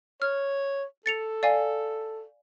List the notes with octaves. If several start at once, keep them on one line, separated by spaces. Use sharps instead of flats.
C#5 F6
A4 A6 C#7 F7
D5 F5 G#5